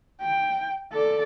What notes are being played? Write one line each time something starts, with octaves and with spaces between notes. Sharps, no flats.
G5
A4 D5